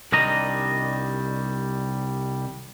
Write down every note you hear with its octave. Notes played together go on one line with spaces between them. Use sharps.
C2 D#3 G3 D4 D#5 A#5